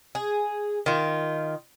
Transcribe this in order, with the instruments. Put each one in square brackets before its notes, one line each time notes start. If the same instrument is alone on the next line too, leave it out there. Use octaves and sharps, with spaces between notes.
[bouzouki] G#4
D#3 F4